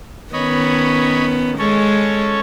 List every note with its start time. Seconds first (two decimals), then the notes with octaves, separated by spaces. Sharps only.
0.33 D#3 B3 C#4 C#5 D#5 B5
1.59 G#3 C#4 A4 C#5